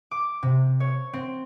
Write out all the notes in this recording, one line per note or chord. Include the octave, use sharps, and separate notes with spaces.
D6
C3
C#5
C4